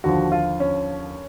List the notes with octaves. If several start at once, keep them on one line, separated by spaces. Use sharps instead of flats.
D#2 D3 F3 F#4
F4
C#4